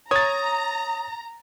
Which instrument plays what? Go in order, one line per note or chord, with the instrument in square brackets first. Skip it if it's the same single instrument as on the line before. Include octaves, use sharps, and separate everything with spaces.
[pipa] C#5 [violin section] A#5 [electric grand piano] D#6 A6